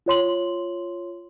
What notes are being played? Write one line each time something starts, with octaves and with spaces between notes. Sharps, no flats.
F4 C#5 C6 F#7